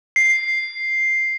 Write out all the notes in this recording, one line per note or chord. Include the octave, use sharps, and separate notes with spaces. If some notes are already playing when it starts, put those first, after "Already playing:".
C7